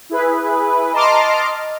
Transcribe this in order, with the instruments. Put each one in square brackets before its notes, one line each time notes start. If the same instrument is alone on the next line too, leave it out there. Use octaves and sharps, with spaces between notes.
[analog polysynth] E4 G#4 B4
D#5 A5 A#5 C6 D6 F6